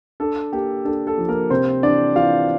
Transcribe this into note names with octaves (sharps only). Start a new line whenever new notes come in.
D4 A4
A#3 G4
D4 A4
A4
F3
A#3 A#4
C3 C4 C5
E3 D4 D5
E3 F4 F5